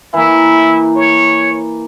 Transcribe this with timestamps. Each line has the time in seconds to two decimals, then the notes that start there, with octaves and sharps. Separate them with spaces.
0.14 E3 A#3 E4
0.96 C#5